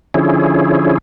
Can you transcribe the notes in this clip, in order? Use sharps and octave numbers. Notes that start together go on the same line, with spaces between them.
D3 F3 C#4 E4 G#4